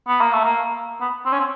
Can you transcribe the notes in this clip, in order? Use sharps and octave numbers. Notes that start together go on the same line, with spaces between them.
B3
A#3
A3
A#3
B3
C4
C#4
C4